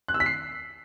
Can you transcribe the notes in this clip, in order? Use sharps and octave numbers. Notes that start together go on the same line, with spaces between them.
F#6
E6
B6
C7